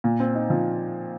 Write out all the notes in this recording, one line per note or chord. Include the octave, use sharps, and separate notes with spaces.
A#2
C4
D#4
F3